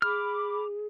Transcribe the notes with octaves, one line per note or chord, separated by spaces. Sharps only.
G#4 B5 D6 F6